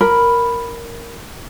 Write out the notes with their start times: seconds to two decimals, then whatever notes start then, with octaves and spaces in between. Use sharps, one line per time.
0.01 A#4 B5